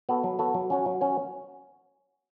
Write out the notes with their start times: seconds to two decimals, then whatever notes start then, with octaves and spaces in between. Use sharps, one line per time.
0.09 B3 F#4 A4
0.24 F#3
0.39 B3 F#4 A4
0.54 F#3
0.70 C#4 F#4 C#5
0.86 F#3
1.01 C#4 F#4 C#5